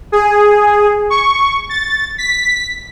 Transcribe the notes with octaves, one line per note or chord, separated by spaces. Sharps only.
G#4
C#6
A6
B6